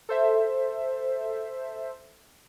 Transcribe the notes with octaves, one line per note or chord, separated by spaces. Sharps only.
A4 C5 E5